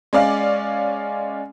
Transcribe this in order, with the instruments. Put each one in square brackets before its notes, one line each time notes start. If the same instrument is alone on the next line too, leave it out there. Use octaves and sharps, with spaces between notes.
[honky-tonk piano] G#3 C#4 D5 F5